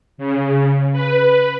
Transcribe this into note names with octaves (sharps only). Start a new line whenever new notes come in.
C#3
B4